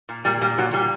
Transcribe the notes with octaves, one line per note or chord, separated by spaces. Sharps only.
A#2
A#2 G3
A#2 G3
A#2 F#3
A#2 G3